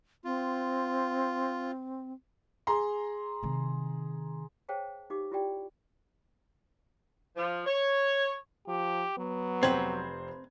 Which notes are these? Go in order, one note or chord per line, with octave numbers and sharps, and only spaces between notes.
C4 F4
G#4 A#5 C6
C3 D#3
G#4 C5 C#5 F5 G5 A5
D#4 G4 F5 D6
E4 F4 G4 D5 G5
F3
C#5
F3 G4
F#3 B3
F1 C4 B4 C5 G#6